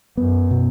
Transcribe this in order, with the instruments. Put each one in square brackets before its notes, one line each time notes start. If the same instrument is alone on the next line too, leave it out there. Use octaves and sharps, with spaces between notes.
[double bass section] F#2 [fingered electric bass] B3
[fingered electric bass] B2